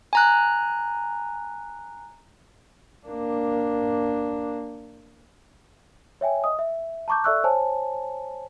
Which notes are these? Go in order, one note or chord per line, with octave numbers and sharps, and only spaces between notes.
G#5 A#5 F#6
A#3 D4
C#5 E5 G5 G#5
D#5 D#6
E5
A5 A#5 C#6 D6 G6
A4 D5 E5 C#6 E6 F#6
C5 C#5 G#5 A5